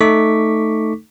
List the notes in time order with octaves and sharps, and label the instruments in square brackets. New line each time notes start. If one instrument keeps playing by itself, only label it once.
[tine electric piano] A3 D#4 A4 C#6 D6 B6